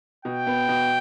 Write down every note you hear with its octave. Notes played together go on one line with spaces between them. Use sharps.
B2 G5
B3
B2